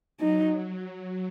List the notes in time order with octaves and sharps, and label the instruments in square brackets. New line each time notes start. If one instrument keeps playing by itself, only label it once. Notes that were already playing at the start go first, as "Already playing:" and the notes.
[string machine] F#3 [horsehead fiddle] D#4